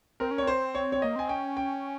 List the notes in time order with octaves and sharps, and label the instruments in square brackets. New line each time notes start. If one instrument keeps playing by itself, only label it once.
[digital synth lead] C4 [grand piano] A#4
[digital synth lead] C#4
[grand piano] C#5
[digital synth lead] C4 [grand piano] C5
[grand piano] C#5
C#5
[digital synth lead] A#3 [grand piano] D#5
[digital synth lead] C4 [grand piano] G#5
[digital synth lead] C#4 [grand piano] G5
[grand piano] G5